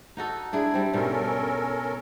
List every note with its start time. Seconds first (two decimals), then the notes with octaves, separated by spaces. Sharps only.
0.17 D#4 F#4 A4
0.53 D4 E4 G#4
0.74 G3 C4
0.93 G#2 B2 G3 C#4 A4 A#4